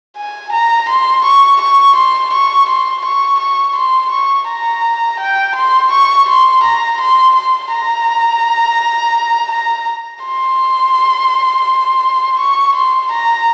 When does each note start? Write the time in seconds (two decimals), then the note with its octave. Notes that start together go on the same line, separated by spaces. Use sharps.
0.17 G#5
0.53 A#5
0.89 C6
1.25 C#6
1.62 C#6
1.96 C6
2.33 C#6
2.69 C6
3.05 C#6
3.40 C#6
3.76 C6
4.12 C#6
4.48 A#5
5.20 G5
5.56 C6
5.92 C#6
6.29 C6
6.64 A#5
7.01 C6
7.36 C6
7.73 A#5
9.52 A#5
10.25 C6
12.40 C#6
12.76 C6
13.12 A#5